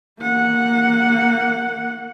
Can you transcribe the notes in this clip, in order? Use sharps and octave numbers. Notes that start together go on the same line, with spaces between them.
A#3 F#5